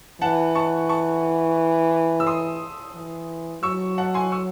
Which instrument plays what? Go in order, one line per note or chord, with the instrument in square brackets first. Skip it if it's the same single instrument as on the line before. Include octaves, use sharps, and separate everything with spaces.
[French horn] E3 [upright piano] F#5 A5
[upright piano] A5 C#6
A5 C#6
E6
C6 D#6
[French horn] E3
[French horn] F#3 [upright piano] C#6 E6
[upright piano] F#5 A5
G#5 C6
C#6 E6